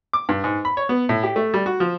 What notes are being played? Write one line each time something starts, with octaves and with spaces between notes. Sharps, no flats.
D6
G2
G#2
B5
C#5
B3
A2
G4
A3
G3
F#4
F3